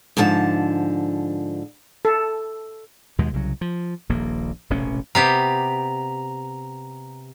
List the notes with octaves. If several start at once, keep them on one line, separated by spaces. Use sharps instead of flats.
G#2 D3 F3 A4 A5
A4
D#2 B2 G#3
C2 C#3 F#3
F3
D#1 A#1 A#3
E1 A1 C3 C#4
C3 B3 G4 A#5